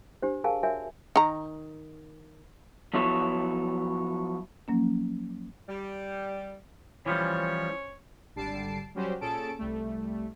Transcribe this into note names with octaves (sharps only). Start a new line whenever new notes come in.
D4 G4 C5
G#4 A#4 F5 G#5 A5
F#4 A#4 C#5 E5 G#5
D#3 A#5
F3 F#3 B3 E4 A4 C#5
F3 F#3 A#3 C#4
G3
E3 F3 G3 C#4 C5 C#5
G#1 D3 G3 A5 C7 D7
F#3 G3 C#4 F#4 G4 C5
A#2 C#4 G#4 A4 A5 D7
C2 G3 A3